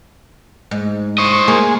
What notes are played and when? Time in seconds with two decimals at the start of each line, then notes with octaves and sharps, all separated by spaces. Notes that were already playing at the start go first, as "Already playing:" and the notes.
0.71 G#2
1.18 C5 D#5 C#6
1.48 G#3 A#3